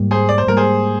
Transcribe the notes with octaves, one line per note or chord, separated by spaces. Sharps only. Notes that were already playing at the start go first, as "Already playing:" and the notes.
Already playing: G#2 G3 A#3
G#4 C5
D5
C5
G#2 G3 A#3 A#4
G#4 C5